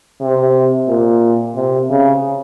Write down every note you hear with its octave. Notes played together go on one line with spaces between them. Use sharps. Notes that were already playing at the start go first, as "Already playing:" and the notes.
C3
A#2
C3
C#3